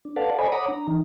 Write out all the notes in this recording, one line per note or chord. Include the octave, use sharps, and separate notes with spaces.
D4
A4 B4 D5 F5 F#5 A5
A4 C5 D5 D#5 G#5 B5
C#5 F#5 A#5 B5 D6 D#6
D4 A#5
E3 D#4